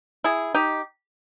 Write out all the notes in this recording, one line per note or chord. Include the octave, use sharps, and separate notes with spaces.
E4 G#4
D#4 G4